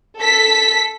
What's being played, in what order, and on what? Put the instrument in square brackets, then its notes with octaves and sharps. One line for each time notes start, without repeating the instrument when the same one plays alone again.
[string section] A4 B6